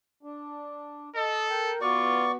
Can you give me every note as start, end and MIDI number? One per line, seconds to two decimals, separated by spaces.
0.23 1.10 62
1.16 1.73 69
1.16 1.47 75
1.49 1.79 70
1.49 1.79 79
1.81 2.37 59
1.81 2.28 65
1.81 2.37 66
1.81 2.32 74
1.81 2.32 85